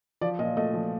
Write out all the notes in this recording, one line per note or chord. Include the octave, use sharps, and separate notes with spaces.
F3 D5
A#2 D#5
A3 D#5
F3